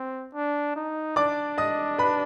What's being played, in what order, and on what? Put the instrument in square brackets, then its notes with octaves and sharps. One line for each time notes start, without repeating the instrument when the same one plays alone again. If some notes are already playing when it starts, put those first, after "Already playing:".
Already playing: [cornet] C4
D4
D#4
[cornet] D4 [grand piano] D5 D6
[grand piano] D#5 D#6
B4 B5